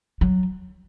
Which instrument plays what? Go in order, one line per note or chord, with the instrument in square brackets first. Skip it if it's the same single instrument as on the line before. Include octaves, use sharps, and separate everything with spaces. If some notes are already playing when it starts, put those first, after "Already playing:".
[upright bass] F#3